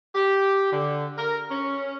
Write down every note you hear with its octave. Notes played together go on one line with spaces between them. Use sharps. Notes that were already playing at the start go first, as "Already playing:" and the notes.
G4
D3
A#4
C#4